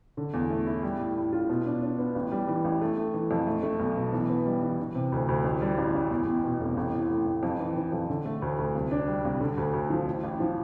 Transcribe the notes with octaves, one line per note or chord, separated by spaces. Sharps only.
D3
E2
A3
E4
G3
A2
A2
F4
B2
D4
D4
B3
A1
G3
E3
A1
A3
A3
E3
F2
A3
A3
B1
B2
E3
B3
G3
E3
E3
C3
D2
D2
A1
G3
A1
A1
E2
E2
B2
F1
A1
A2
A2
A1
F2
E3
E3
F2
D3
A3
D2
D2
C2
D4
G3
C2
D3
D2
D2
F3
A1
A1
F3